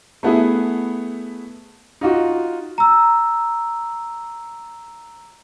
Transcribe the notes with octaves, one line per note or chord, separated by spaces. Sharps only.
A3 B3 E4 G#4
D#4 F4 F#4
A#5 E6